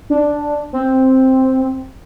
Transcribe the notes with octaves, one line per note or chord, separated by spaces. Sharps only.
D4
C4